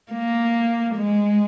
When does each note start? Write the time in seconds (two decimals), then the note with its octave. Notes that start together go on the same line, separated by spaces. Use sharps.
0.12 A#3
0.95 G#3